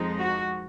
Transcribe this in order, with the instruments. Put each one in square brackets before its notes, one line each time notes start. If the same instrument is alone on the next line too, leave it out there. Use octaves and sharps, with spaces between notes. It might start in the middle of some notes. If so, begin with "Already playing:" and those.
Already playing: [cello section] F2 F3 G#3 D#4
F#4